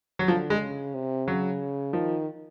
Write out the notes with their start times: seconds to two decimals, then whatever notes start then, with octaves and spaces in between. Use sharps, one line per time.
0.19 F#3
0.28 D3 F3
0.50 G#3
0.62 C#3
0.94 C3
1.27 C#3 F#3
1.93 D#3 F3